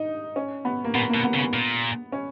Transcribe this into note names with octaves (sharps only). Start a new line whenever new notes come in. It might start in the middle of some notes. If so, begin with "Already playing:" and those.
Already playing: D#4
C#4
B3
A#3
A#2 B3
B2 A#3
B3
C#3
B3
A#2
C#4